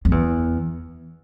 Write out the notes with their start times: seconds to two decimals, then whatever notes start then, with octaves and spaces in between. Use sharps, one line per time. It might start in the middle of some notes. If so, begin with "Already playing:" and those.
0.05 F2
0.11 E2